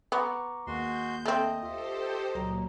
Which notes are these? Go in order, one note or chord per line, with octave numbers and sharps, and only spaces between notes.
B3 A#5 C#6 D6
D#2 G#3 A#3 F#4 C6 G6
A3 C4 D#5
F4 G4 A4 C5 E5
C#2 A#2 F#3 A#5